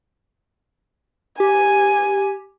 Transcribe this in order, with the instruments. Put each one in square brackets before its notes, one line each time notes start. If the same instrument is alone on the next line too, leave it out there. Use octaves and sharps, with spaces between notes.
[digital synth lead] G4 [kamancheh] G#5